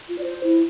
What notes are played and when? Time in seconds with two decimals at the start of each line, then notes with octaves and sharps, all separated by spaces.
0.09 F4
0.18 D5
0.24 C5
0.43 E4